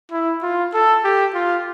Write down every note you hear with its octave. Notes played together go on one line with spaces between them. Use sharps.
E4
F4
A4
G4
F4